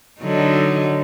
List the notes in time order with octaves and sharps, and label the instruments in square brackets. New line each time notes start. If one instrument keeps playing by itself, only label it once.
[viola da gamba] D3 F#3 D#4